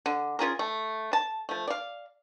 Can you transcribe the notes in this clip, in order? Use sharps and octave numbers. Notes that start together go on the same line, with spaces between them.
D3
C#4 F4 G#4 A#4
A3
A5
F3 A3
D5 F5